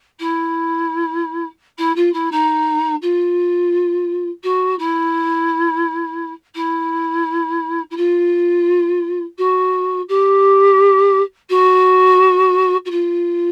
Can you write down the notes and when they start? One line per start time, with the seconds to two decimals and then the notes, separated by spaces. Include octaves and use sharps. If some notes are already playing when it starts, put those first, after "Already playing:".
0.19 E4
1.78 E4
1.96 F4
2.13 E4
2.31 D#4
3.02 F4
4.43 F#4
4.78 E4
6.55 E4
7.90 E4
7.97 F4
9.38 F#4
10.08 G4
11.49 F#4
12.85 F#4
12.90 F4